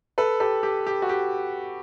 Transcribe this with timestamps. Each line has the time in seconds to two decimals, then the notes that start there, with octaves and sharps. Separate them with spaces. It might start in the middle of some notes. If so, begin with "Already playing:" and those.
0.18 A4 B4
0.40 G4 A4
0.63 G4
0.87 G4
1.02 F#4
1.09 G4